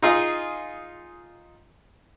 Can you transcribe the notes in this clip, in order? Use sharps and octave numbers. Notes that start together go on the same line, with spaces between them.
D#4 F4 G#4 D#5